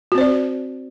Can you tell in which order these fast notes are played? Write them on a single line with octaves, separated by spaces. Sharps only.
F#4 C4 C5 D5